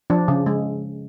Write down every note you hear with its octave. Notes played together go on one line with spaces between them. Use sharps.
F3 D4
C#3
G#3